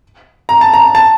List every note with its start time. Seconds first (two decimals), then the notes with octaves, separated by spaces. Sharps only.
0.49 A#5
0.61 A5
0.74 A#5
0.95 A5